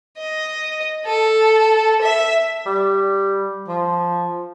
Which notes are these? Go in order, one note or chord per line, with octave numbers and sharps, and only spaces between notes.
D#5
A4
E5
G3
F3